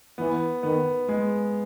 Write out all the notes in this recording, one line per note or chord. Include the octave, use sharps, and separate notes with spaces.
E3 B3
D#3 B3
G#3